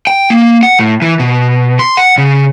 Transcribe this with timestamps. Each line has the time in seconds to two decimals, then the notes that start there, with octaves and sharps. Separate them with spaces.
0.07 G5
0.30 A#3
0.63 F#5
0.80 A2
1.02 E3
1.20 B2
1.79 C6
1.97 F#5
2.18 C#3